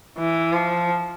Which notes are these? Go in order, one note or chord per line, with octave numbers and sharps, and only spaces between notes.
E3
F3